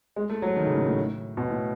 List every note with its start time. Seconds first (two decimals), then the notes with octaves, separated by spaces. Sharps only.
0.16 G#3
0.30 A3
0.42 F#3
0.56 D#3
0.67 C#3
0.76 A2
0.87 A2
1.37 B2
1.50 A2